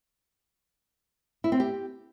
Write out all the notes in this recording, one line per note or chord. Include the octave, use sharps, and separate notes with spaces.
E4
C4
G4